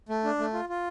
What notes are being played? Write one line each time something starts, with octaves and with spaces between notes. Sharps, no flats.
A3
D4
A3
F4
F4